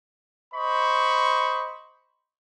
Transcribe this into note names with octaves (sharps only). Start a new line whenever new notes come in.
C5 D#5 B5 C#6